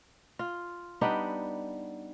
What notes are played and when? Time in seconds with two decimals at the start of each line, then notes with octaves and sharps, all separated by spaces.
0.39 F4
1.01 G3 B3 D4 D#4